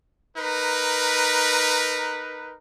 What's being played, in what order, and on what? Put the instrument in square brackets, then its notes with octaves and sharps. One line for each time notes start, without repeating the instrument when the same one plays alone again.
[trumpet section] D#4 A#4 B4